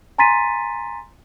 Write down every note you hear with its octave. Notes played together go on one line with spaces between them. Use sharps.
G#5 A#5 C6 A6 B6 D#7